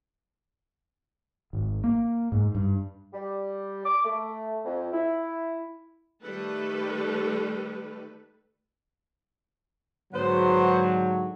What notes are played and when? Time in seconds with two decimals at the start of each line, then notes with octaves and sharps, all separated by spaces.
1.53 G#1
1.84 A#3
2.32 G#2
2.55 G2
3.13 G3
3.85 D6
4.04 A3
4.65 F2
4.92 E4
6.24 D#3 G3 A3 A4 B4
10.14 G#2 D3 F#3 B3 C5